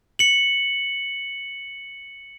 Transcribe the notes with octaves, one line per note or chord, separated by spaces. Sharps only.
C#7 F#7